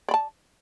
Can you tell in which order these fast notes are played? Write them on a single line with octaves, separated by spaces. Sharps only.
D5 B5 A5